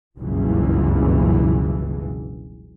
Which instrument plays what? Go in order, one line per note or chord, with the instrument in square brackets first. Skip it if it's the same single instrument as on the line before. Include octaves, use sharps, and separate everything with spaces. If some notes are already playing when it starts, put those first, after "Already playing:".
[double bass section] F#1 C#2 G2 B2 E3